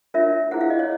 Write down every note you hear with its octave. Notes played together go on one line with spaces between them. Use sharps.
D4 F4 A#4 C#5 E5
E4 G#4 C5 F#5
F5
D#5
C#5